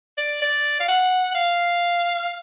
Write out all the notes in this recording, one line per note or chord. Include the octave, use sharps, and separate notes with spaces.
D5
D5
F5
F#5
F5